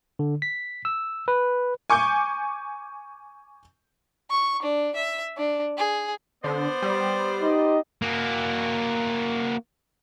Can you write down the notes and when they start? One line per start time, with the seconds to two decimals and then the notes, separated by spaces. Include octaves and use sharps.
0.19 D3
0.42 B6
0.85 E6
1.28 B4
1.90 G#5 C#6 D6 G6
4.30 C#6
4.62 D4
4.96 E5
5.37 D4
5.77 G#4
6.44 D3 B3 C5 D5
6.82 G3
7.41 D#4 G4 D#5
8.02 A#3 F#4